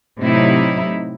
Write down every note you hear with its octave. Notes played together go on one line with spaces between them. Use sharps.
A2 C3 F#3 D#4 E4